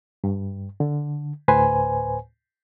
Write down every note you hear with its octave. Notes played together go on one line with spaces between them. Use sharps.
G2
D3
D2 A2 B4 C5 G#5